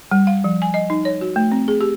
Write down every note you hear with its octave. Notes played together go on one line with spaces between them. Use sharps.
G3
F5
F3
G#5
D#5
D#4
C#5
F#4
A3
C4
G#4
G4